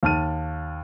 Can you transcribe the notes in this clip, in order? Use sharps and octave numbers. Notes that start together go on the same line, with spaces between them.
D#2 A5 F6 D#7